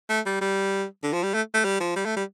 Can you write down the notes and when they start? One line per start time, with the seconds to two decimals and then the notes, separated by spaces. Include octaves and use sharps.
0.09 A3
0.26 G3
0.41 G3
1.03 D3
1.13 F3
1.24 G3
1.34 A3
1.54 A3
1.64 G3
1.81 F3
1.96 G3
2.05 A3
2.16 G3